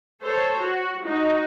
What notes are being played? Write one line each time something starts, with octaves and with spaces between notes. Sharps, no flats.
A4 C5 C#5
F#4
D#4 F#4